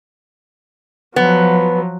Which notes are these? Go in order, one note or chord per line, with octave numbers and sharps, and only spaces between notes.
F3 F#3 B3